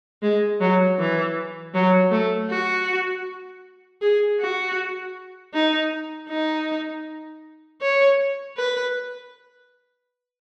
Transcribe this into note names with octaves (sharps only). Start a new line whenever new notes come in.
G#3
F#3
E3
F#3
A3
F#4
G#4
F#4
D#4
D#4
C#5
B4